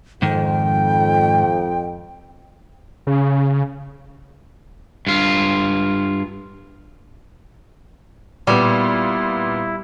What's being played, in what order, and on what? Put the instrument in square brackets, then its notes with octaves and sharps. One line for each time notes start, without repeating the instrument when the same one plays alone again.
[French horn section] F2 [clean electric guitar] G#2 D#3 [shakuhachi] G5
[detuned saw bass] C#3
[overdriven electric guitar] G2 F4
[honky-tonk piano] A#2 B3 [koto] G3 [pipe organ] E4